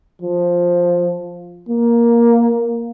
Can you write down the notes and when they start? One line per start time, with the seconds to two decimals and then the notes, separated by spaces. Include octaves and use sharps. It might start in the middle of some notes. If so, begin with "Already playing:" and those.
0.22 F3
1.69 A#3